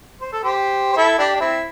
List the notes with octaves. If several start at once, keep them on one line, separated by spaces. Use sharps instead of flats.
C5
A4
G4 C5
C5
E4 A4
D4 G4
D4
C4 E4